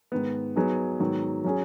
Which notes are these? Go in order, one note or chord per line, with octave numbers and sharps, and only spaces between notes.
G#2 D#3 B3
F#3 B3 D#4 G#4
G#2 D#3 F#3 B3
F#3 C#4 G#4